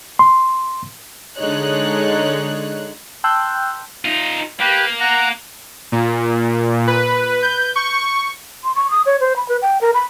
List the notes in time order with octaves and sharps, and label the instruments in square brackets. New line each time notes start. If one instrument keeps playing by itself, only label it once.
[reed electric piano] C6
[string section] D3 G#3 D#4 C#5 F#6
[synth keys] G5 A5 C6 E6 F#6 G6
[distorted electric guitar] D#4 F4
[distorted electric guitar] A#3 [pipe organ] G4 B4
[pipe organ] F#5 A#5
[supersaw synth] A#2
B4
G6
C#6
[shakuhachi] C6
C#6
D#6
C#5
C5
B5
B4
G5
A#4
B5